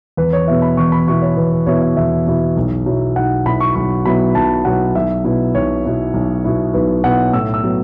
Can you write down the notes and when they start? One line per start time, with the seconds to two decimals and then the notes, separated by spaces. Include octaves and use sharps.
0.17 E2 B4
0.33 C#5
0.47 B2 B3 E4 E5
0.62 B5
0.77 E2 C#6
0.92 B5
1.07 B2 B3 E4 C#6
1.22 C#5
1.37 E2 B4
1.52 B4
1.66 B2 B3 E4 C#5
1.82 E5
1.96 E2 E5
2.27 B2 B3 E4
2.56 B1
2.86 B2 F#3 B3 E4
3.16 B1 F#5
3.46 B2 F#3 B3 E4 B5
3.60 C#6
3.75 B1 C#6
4.05 B2 F#3 B3 E4 B5
4.35 B1 A5
4.65 B2 F#3 B3 E4 F#5
4.95 B1 E5
5.24 B2 B3 E4
5.55 B1 C#5
5.84 B2 B3 E4
6.14 B1
6.44 B2 B3 E4
6.74 B1 B4
7.04 B2 B3 E4 F#5
7.33 A2 E6
7.54 E6
7.63 F#3 B3